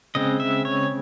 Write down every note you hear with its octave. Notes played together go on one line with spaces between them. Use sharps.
C#3 G#3 C4 D#5
E5
C#5